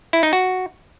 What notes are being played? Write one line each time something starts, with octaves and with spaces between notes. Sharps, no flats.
E4
D#4
F#4